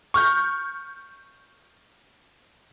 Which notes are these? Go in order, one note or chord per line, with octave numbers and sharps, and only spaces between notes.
C#6 F6 G6